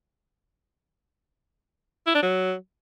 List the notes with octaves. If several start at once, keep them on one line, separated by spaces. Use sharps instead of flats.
E4
D4
F#3